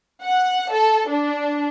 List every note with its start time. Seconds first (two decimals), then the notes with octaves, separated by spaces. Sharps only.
0.24 F#5
0.73 A4
1.09 D4